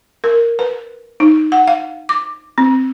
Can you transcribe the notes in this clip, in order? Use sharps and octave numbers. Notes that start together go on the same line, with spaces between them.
A#4
B4
D#4
F#5
F5
D6
C4